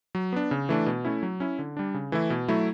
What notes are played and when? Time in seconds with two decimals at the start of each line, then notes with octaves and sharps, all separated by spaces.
0.15 F#3
0.33 B3 D4
0.51 C#3
0.69 E3 A3 D4
0.86 B2
1.05 A3 C#4 E4
1.23 F#3
1.40 C#4 E4
1.59 D3
1.77 G3 D4
1.94 C#3
2.12 E3 A3 E4
2.30 B2
2.48 F#3 A3 E4